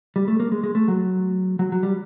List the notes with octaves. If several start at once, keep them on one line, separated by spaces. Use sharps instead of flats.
G3
A3
A#3
G#3
G#3
A3
F#3
F#3
F#3
G3